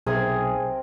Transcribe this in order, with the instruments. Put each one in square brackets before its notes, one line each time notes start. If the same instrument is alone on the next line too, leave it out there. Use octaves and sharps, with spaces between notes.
[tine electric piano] B1 [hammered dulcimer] C3 A#4 C6 [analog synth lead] G#4